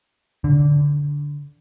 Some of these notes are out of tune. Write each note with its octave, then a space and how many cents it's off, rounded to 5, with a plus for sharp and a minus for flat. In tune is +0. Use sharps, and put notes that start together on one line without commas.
D3 -15